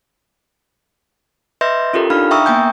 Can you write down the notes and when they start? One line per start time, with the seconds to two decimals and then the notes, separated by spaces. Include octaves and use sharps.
1.61 B4 D#5 E5 C6 G6 A#6
1.93 C#4 F4 G4 A4 A#4
2.10 D4 D#4 F5 B5 F6
2.31 E5 G5 A#5 C#6 D#6 E6
2.46 A#3 B3 G5 G#5 G6